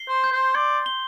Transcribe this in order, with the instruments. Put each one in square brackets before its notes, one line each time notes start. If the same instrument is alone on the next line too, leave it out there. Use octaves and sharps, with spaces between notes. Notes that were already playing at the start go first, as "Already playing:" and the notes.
Already playing: [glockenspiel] C7 G7
[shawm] C5
[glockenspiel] G6
[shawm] C5
[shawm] D5 [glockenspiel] C6
[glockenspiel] G7